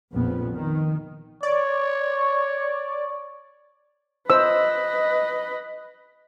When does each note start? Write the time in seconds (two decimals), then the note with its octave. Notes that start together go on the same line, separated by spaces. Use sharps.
0.13 A#1 F2 F3 B3
0.50 D#3
1.43 C#5 D5
4.30 B4 C5 D#5 E6